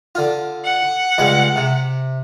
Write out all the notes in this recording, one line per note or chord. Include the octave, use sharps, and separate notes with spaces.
D3 F4
F#5
C#2 G3 G#3
C3